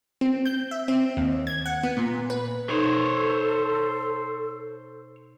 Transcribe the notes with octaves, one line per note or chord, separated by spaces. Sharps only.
C4
G6
E5
C4
D#2
G#6
F#5
B3
A#2
B4
B2 D#4 A4 C5 C#5